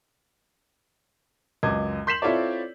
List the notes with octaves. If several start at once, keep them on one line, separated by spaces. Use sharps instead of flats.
C#2 F#2 D#5 D6 G#6
C6 G6 B6 C7 E7 F#7
C4 E4 F4 A4 C#5 D5